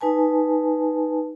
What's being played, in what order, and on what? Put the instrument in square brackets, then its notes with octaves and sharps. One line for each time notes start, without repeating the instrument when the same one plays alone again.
[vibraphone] D#4 B4 G#5 A5